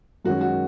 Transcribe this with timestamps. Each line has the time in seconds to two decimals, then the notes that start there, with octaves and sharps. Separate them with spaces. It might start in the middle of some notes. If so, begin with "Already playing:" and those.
0.25 F#2 D#3 G#3 C#4 F#4
0.41 F#4